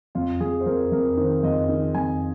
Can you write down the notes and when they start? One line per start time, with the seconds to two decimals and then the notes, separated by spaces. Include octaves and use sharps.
0.15 F2 F4
0.40 F2 G#4
0.61 C5
0.66 F2 A#4
0.92 F2 A#4
1.17 D#3 C5
1.43 F2 D#5
1.69 D#3
1.95 F2 G#5